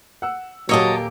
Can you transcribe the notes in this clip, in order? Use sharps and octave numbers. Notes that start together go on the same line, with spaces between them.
F#5 E6
D#1 F#3 A#3 G4 C#5 D#5 A5 E6